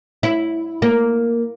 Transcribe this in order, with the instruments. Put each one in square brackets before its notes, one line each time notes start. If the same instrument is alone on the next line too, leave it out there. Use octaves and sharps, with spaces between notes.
[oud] E4
A#3